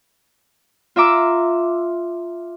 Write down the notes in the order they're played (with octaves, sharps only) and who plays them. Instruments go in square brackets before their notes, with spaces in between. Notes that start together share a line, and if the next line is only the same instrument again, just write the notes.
[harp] F4 E5 A#5 D6 E6